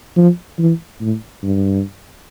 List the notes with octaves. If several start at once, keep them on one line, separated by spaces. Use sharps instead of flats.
F3
E3
A2
G2